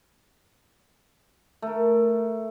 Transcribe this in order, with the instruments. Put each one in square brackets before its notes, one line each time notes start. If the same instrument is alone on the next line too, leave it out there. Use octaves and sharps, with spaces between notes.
[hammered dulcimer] A3 A#4